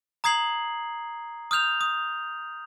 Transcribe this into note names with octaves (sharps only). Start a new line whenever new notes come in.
A#5 D#6 G#6 C7 F#7
D#6 F6 G6 F7
D#6